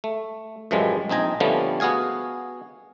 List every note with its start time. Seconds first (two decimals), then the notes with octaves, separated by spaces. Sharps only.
0.04 A3
0.71 F#2 A2 E3 F3 G3 G#3
1.09 A#1 C4 D#4 G#5 A#5
1.40 D3 F3 G3 A3 B3 C#4
1.80 B3 F#4 G#4 F5 G#5